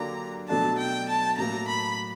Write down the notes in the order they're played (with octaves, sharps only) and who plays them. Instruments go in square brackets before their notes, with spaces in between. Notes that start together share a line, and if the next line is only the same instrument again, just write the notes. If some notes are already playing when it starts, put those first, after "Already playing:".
Already playing: [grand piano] D3 F#3 A#3 D4 G4 [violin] A#5
[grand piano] B2 F#3 A3 D4 [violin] A5
[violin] G5
A5
[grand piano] A2 F#3 A#3 [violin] A#5
[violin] B5